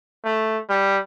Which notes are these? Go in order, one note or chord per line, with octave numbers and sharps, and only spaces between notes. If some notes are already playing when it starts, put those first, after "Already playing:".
A3
G3